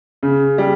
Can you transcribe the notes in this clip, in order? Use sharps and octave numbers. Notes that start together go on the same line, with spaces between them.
C#3
G3